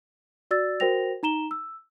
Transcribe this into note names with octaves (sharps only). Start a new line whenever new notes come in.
F#4 D5 E6 A6
F#4 A#4 C5 G5 A#6 F7
D#4 A#5 E7 G7
E6